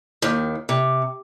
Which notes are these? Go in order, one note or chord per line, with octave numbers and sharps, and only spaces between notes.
D#2 D#3
C3